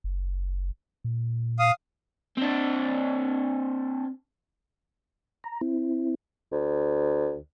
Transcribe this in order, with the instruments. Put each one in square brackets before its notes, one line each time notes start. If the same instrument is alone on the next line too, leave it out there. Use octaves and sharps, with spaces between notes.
[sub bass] F#1
A#2
[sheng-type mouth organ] F5 D#6
[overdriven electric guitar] C4 D4
[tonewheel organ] A#5
C4 E4
[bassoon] D2